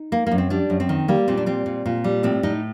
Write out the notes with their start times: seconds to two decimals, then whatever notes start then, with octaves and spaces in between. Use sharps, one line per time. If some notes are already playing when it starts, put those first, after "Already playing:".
Already playing: D#4
0.12 A#3
0.27 F#2 A#3
0.38 C4
0.50 G3 D4
0.70 F#2
0.80 C4
0.89 D#3
1.08 G3 A#3
1.28 A#2 C4
1.38 D4
1.46 G3 C4
1.66 A#2
1.86 A#2
2.04 G3
2.23 A2 C4
2.43 A2 D#4